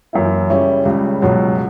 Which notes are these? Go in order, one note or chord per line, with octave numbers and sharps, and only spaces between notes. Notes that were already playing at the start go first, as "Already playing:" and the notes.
F#2 E3 A#3 E4
C#3 G3 C#4 E4
C#2 C#3 G3
C#2 B2 F#3